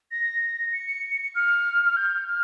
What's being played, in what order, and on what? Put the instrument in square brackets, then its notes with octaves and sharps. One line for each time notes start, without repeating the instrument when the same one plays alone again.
[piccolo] A#6
C#7
F6
F6
G6
F6